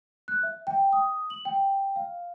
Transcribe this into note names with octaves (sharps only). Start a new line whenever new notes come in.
F#6
E5
G5
D#6
F#7
G5
F5